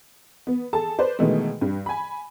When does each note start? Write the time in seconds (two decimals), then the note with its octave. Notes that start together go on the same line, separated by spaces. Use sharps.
0.47 B3
0.73 G#4 A4 A5
0.98 B4 C5 D5
1.19 B2 D#3 E3 G#3 A3
1.61 G2
1.86 G#5 B5